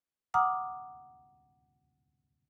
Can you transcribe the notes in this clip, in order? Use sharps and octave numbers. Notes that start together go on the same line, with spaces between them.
F#5 A#5 D6 D#6 F6